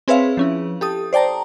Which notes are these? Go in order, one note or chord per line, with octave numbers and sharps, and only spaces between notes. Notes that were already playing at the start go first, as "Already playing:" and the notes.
C4 G#4 B4 C#5 E5 F5
F3 C#4 E4
G4 A4 D#6
C5 D5 G5 A5 A#5